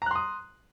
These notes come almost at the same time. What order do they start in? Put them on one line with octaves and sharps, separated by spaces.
A#5 F#6 C6 D#6